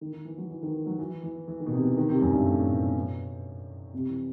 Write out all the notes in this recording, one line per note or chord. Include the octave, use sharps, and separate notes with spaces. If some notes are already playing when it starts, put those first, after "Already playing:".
D#3
D#3
E3
F#3
E3
D#3
E3
F#3
E3
E3
E3
D#3
B2
C3
E3
D#3
C3
F#2
G2
A2
B2
C3
E3